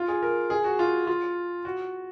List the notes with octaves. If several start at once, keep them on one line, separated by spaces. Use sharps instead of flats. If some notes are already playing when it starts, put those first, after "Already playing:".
Already playing: F4
G#4
A#4
G#4
F#4
F4
F4
F#4